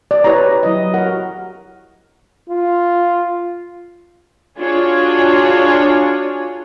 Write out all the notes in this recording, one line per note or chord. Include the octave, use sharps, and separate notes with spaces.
D5
E4 G4 B4 C#5 A#5
F#3 E4 D#5
F#4 A#4 F#5
F4
D4 F4 F#4 G#4 C#5